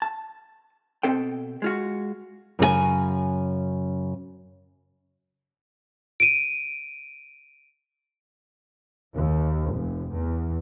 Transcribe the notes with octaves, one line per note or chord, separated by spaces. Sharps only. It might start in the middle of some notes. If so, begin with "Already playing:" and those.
A5
B2 C4 A4 G5
G#3 F4 F#4
F#2 C#3 G#4 G#5
D7 D#7
D#2
F1
E2